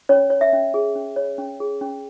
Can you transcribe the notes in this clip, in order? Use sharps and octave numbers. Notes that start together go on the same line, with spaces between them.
C#4 C#5
C#5
E5
C#4
G#4
C#4
C#5
C#4
G#4
C#4